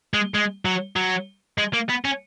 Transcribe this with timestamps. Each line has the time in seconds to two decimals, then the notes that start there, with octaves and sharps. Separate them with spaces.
0.14 G#3
0.34 G#3
0.65 F#3
0.96 F#3
1.58 G#3
1.73 A#3
1.89 B3
2.05 C#4